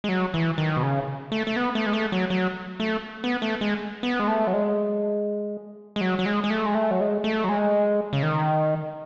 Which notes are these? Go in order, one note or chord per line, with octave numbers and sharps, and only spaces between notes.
G#3
F#3
E3
D#3
B2
C#3
A3
A3
B3
A3
G#3
A3
F#3
F#3
A3
B3
A3
G#3
B3
G#3
A3
F#3
G#3
G#3
F#3
F#3
G#3
G#3
A3
G#3
A3
F#3
G#3
A3
F#3
G#3
C#3
D#3